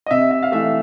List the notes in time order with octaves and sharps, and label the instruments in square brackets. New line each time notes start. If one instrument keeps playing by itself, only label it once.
[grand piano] D#5
C3 E5
E5
F5
E3 A3 E5